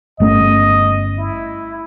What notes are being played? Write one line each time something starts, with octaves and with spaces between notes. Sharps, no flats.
G1 A3 C#4 D#5
E4